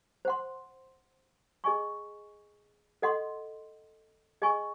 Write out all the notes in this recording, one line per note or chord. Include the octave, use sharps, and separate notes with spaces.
C5 F#5 C6
G#4 D#5 G#5 C#6
A4 D#5 F#5 C6
G#4 D#5 G#5 C#6